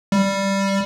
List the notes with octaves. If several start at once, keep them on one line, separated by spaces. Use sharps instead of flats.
G3